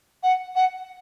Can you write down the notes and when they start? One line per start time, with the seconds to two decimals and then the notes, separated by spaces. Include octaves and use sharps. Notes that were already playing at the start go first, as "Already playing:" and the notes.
0.23 F#5
0.55 F#5